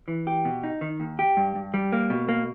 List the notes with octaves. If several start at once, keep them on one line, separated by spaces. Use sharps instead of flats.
E3
G4
B2
D#4
D#3
D#2
G4
G2
G2
G3
A#3
B2
A#3